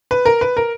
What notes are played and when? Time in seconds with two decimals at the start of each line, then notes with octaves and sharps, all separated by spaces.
0.11 B4
0.25 A#4
0.41 B4
0.57 A#4